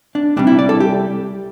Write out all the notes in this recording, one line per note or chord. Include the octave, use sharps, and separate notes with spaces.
D4
C2 C3 G3 D4
E4
D5
A4
G4